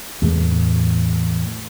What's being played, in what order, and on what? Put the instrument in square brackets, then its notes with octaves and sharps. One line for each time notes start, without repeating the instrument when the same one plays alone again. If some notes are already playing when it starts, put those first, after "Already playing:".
[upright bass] E2 A2